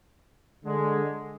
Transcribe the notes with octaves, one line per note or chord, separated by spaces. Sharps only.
D3 G#3